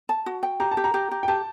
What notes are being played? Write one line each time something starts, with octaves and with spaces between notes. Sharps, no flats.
A5
F#4
G5
G4 A#5
A5
G4
A#5
G4
G4
G5
G4 A5